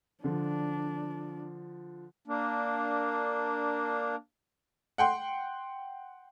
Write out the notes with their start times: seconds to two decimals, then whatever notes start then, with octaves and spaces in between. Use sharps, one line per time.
0.24 D3 F3 D4
2.27 A#3 D4
4.98 F#5 G5 C6